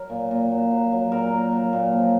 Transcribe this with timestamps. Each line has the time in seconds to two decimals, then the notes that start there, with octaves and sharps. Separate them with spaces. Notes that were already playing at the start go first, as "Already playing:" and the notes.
Already playing: F#3 A#4
0.10 A#2
0.31 A#2
0.52 F#3
0.71 F#3
0.92 F#3
1.12 A#2 A#4
1.32 A#2
1.52 F#3
1.73 A#2
1.93 F3